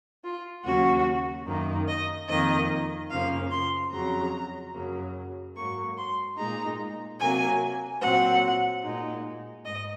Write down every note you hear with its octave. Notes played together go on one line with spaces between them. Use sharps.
F4
D#2 C#3 F#3 A#3 C#4 F#4
F#2 D#3 A#3 D#4
D#5
F2 D#3 A#3 D#5
F#2 C#3 F3 A#3 F5
C6
F2 C#3 F#3 A#5
F#2 C#3 F#3 A#3
G#2 F#3 A#3 C#6
C6
A#2 G#3 D#4 A#5
C3 F#3 A#3 G#5
A#2 F#3 C4 F#5
A#2 G#3 D#4
G#2 D#5